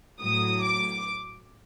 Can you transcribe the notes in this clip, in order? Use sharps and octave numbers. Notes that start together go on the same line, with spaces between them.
A2 F#3 D#6
D6